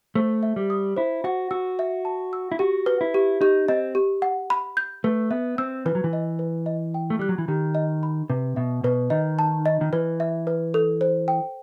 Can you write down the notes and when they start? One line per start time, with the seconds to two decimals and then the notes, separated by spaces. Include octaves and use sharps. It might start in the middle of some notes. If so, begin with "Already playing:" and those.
0.15 A3 C5
0.43 E5
0.56 G3
0.70 D#6
0.96 E4 C5
1.24 F#4 F#5
1.51 F#4 E6
1.79 E5
2.05 A5
2.33 E6
2.52 E4
2.59 F#4 G4
2.86 B4
3.01 E4
3.14 G4
3.41 D#4 G4
3.68 C4 D#5
3.95 G4
4.22 F#5
4.50 B5
4.77 G6
5.04 A3 B4
5.31 B3 E5
5.58 C4 E6
5.86 E3 B4
5.95 F#3
6.04 E3
6.13 D#5
6.39 B4
6.66 D#5
6.94 G5
7.10 A3
7.19 G3 F#6
7.29 F#3
7.38 E3
7.48 D#3 G4
7.75 D#5
8.03 B5
8.29 C3 B4
8.56 B2 E5
8.84 B2 B4
9.10 D#3 D#5
9.39 A5
9.66 D#5
9.81 D#3
9.93 E3 B4
10.20 E5
10.47 B4
10.74 A4
11.01 C5
11.28 G5